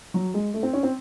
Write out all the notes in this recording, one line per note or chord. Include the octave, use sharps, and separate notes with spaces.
F#3
G#3
A3
C4
C#4
C4